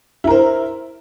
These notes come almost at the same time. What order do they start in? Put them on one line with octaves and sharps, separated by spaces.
E4 A#4 C5